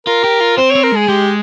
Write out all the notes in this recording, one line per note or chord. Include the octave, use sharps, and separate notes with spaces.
F4 A#4
G4
F4
C4 C5
C4 C#5
A#4
G#3 G#4
G#3 G4